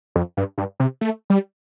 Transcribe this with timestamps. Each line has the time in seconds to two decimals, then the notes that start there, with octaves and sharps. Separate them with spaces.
0.16 F2
0.37 G2
0.58 G2
0.80 C3
1.01 A3
1.30 G3